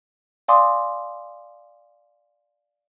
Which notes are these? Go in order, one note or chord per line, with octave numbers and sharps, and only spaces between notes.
D5 F5 G#5 C6 D6 D#6